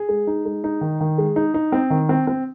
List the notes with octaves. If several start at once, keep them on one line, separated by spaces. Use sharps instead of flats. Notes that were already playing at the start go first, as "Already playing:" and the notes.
Already playing: G#4
G#3
D#4
G#3
D#4
D#3
D#3
G#3
D#4
D#4
C4
D#3
C4
C4